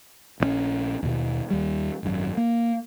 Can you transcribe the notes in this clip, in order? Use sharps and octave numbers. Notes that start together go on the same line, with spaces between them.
A#1 E3 C#4
D#2 B2
D#2 G3
G#1 F#2
A#3